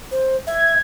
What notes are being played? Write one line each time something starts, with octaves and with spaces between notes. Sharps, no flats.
C5
E5 G#6